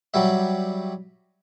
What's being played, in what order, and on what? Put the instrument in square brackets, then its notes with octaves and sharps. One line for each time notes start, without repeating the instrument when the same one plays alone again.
[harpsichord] F#3 G3 E5